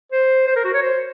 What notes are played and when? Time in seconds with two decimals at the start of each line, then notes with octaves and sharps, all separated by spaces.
0.12 C5
0.47 C5
0.56 A#4
0.65 F#4
0.74 C#5
0.83 C5